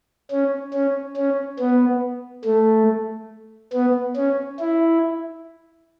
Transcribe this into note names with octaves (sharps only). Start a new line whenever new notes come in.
C#4
C#4
C#4
B3
A3
B3
C#4
E4